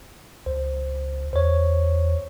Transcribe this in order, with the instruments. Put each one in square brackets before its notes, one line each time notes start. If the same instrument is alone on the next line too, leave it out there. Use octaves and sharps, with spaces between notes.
[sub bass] C#2 [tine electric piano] C5
[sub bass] E2 [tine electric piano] C5 C#5